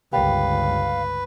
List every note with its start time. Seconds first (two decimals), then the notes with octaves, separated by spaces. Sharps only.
0.13 G1 C#2 G4 A#4 B4 D5 F5